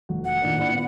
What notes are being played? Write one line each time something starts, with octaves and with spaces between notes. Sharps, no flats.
F1 F#4
F#5
A#2 D#3 D4
A#2 D4 E4
B3 F4